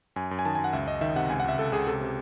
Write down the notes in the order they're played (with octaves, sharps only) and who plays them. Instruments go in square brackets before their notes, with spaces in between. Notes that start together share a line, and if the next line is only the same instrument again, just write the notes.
[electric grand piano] F#2 G#5
F#2
G#5
D#3 A5
F#2 G#5
F#5
C#2 E5
C#2 D#5
D#3 E5
C3 F#5
C#2 G#5
F#5
C#2 E5
C#2 A4
C#2 G#4
C3 A4
C3